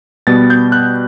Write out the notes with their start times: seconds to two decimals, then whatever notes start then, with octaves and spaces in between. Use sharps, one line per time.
0.27 B2 G3 B3 A6
0.50 G6
0.72 F#6